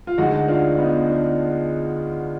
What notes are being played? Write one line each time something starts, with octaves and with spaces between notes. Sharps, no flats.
F4
D2 D3 G#3 D#4 F#4
D4 F4
B3 D#4
D4